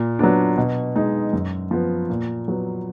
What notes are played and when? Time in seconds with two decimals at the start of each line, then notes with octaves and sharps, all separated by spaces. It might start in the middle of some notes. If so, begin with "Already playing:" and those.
Already playing: A#2
0.19 F#3 B3 D4
0.58 B2
0.95 G#3 D#4
1.33 F#2
1.71 F3 B3
2.10 A#2
2.48 F#3 B3